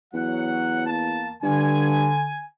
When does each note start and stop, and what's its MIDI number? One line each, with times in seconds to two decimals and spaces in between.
0.14 1.29 40
0.14 0.84 54
0.14 0.84 78
0.86 1.31 58
0.86 1.31 81
1.43 2.11 43
1.43 2.44 50
1.43 2.44 80